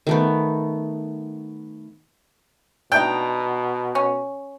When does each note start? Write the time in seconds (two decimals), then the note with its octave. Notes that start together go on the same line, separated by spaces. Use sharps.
0.07 D#3 A3 B3
2.92 B2 D4 D#4 G5
3.95 C#4